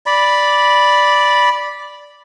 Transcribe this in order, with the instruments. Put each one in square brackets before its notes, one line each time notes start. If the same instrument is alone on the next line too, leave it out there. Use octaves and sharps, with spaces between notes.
[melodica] D5 B5